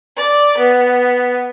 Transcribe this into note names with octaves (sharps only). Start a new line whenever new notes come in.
D5
B3